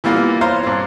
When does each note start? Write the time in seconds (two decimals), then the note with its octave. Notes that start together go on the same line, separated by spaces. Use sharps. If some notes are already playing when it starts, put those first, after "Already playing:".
0.04 E3 G3 A#3 B3 F4
0.41 C5 C#5 F5 A#5 C6
0.63 G2 C4